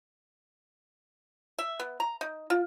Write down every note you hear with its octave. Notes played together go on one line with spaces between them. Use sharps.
E5
B3
A#5
D#4
F4